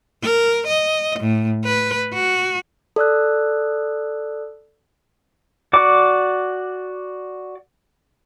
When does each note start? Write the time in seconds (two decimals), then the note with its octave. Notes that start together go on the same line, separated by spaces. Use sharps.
0.23 A#4
0.67 D#5
1.19 A2
1.65 B4
2.14 F#4
2.96 A4 D5 E6 F#6
5.73 F#4 D5 D6